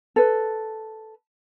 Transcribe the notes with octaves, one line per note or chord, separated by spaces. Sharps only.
A4 B4